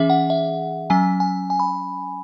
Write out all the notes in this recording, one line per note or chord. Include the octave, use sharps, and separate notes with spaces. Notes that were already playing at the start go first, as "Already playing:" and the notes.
Already playing: E3 C#4 G#4 E5
F#5
E5
F#3 C#4 G#5
G#5
G#5
B5